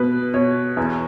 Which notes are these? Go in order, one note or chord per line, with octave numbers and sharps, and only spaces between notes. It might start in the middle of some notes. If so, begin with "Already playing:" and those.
Already playing: B2 B3 B4
B2 C#5
E2